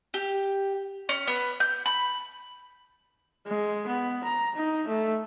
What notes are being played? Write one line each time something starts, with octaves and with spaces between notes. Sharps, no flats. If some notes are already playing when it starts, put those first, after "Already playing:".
G4
C#4
B3
G6
B5
G#3
B3
A#5
D#4
A3